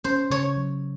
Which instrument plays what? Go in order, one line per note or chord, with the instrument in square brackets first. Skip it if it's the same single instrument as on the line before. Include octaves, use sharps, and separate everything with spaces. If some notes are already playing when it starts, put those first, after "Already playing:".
[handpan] C#4 [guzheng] C5
[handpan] C#3 [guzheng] C#5
[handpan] F#3